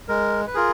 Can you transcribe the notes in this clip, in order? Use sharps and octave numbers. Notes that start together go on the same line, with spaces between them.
G#3 A#4
B4
F4 G#4 A#4